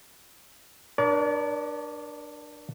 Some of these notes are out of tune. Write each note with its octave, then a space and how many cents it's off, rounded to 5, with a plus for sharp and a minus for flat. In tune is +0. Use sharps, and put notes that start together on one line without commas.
D4 +20 A#4 +40 D5 -40